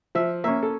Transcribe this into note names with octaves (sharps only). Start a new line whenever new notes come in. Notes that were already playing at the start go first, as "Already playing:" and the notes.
F3 E5
A#3 C#4 E5
A4